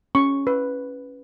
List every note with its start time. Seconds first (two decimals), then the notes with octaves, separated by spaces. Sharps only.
0.15 C#4 C#6
0.47 B4